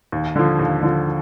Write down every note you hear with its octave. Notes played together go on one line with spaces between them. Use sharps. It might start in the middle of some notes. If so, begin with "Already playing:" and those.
D#2
D3 F3
D#2
D3 F3